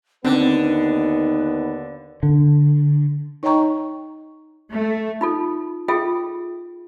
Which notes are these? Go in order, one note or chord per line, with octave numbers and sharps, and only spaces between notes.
D#2 D3 B3 C4 D4 D#4 B4
D3
D#4 C#5 D#5 G5 A#5 C#6
A3
D#4 F4 A4
F4 G#4 A4 E5 G5